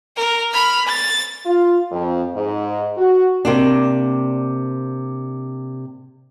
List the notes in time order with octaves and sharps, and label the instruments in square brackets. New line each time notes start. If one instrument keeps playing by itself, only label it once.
[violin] A#4
B5 F6
A6
[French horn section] F4
F2
G#2
F#4
[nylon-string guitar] C3 A#3 D4